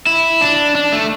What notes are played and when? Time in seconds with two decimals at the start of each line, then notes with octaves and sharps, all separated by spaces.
0.07 E4
0.41 D4
0.75 D4
0.93 A3